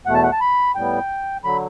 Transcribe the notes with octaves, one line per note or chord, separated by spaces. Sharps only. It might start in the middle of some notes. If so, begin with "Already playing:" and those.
E2 B2 A3 F#5
A5
F#5
A5
B5
A2 G3 B3 G5
D3 F#3 B5